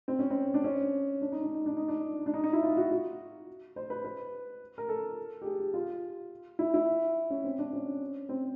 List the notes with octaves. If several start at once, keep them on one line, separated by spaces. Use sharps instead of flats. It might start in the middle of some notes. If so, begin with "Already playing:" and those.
C4
C#4
C4
D4
C#4
D4
D#4
D4
D#4
D4
D#4
D4
D4
D#4
D#4
E4
F4
F#4
F#4
C5
B4
B4
A#4
A4
G4
G#4
G4
F4
E4
E4
C#4
C4
D4
C#4
C4